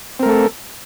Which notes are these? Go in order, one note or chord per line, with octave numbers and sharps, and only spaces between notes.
A3 C4 A4 A#4